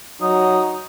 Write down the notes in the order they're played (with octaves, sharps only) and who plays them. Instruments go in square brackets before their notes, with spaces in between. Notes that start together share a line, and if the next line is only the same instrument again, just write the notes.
[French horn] F#3 [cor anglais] D#4 [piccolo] D#6